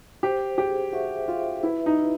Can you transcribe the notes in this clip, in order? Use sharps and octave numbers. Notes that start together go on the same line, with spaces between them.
G4 C5
G4 G#4
F#4 E5
F4 E5
E4 B4
D#4
E4